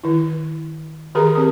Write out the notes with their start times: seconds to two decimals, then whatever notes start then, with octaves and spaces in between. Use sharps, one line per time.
0.04 D#3 E4
1.15 D#3 G4 G#4 A#4 A#5
1.35 C4 G4